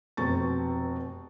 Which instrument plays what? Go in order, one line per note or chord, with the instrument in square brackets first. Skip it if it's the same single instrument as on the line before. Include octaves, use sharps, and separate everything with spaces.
[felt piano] F1 B2 C4 C#6 A6